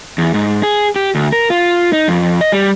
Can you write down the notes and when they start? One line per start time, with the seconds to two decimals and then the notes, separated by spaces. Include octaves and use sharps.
0.18 E2
0.34 G#2
0.63 G#4
0.96 G4
1.15 D2
1.32 A#4
1.50 F4
1.93 D#4
2.08 F2
2.41 D#5
2.52 G3